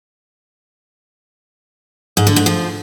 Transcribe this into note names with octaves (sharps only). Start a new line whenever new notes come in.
G#2
D3
G#2
F3